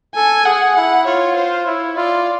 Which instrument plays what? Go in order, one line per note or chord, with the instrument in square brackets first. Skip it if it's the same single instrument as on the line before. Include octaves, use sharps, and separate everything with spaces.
[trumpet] A4 [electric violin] G#5
[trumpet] G#4 [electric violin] F#5
[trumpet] E4 [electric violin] F#5
[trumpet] F4 [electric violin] C#5
[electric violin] C5
[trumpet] E4 [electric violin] C#5
[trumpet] F4 [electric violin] D5